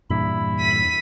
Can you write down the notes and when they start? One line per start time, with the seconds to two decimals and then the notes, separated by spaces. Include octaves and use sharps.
0.10 E2 G2 A#2 E4 B5
0.59 B6 D#7